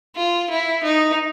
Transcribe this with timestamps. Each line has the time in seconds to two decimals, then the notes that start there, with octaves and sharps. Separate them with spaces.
0.16 F4
0.50 E4
0.84 D#4